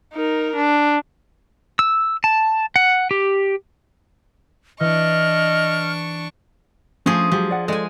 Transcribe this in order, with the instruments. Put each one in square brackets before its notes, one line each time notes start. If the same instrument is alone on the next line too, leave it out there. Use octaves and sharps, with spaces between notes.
[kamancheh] D#4 A#4
D4
[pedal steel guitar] E6
A5
F#5
G4
[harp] E3 B4 C#7 [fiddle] D4 C#6 [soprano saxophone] D#5 [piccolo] F6
[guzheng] F3 G#4 [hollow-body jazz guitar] A3 C#4
[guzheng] F3 [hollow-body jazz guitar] F#3 G#3 G4
[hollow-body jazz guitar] D5 F#5
[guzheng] G#3 G#5 [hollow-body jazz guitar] A4 D5 D#5